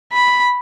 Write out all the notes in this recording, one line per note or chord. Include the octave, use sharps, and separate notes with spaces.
B5